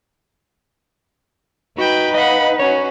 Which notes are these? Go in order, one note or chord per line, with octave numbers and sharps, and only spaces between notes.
D#4 F#4 B4 G5 B5
D#5 F5 F#5 B5
C#4 F#4 C#5